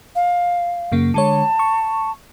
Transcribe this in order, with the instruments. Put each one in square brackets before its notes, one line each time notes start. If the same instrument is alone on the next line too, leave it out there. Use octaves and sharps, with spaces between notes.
[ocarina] F5
[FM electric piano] F#2 C#3 A#3
[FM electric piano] D3 G#3 C#5 [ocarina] A5
[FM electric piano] C#6